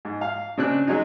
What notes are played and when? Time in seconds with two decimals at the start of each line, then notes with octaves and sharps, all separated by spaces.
0.05 G#2
0.21 F5
0.57 C#3 C4 D4 F#6
0.87 F#3 G#3 D#4